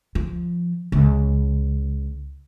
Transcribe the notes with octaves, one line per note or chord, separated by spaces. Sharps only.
F3
C#2